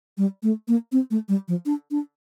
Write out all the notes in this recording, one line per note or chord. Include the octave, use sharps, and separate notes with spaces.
G3
A3
A#3
C4
A3
G3
F3
D4
D4